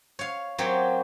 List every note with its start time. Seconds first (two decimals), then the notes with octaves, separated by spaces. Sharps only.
0.19 C#5 F5
0.58 F#3 A#3 C4 G4 C#5 C6